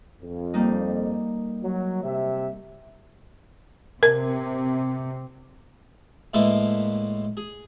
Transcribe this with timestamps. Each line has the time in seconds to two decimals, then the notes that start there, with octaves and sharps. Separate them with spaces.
0.20 F2
0.54 G3 A#3 D#4
1.63 F#3
2.03 C3 E5
4.03 C3 A#4
6.34 A2 D3 G#3 A#3 B4 E5
7.37 G#4